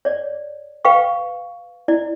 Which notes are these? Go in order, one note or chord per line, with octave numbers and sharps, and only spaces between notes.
C#5 D5
B4 F5 G5 C#6
E4 D5